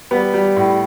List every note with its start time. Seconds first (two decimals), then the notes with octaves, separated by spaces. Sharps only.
0.11 G3 B3 B4
0.34 G3
0.56 A2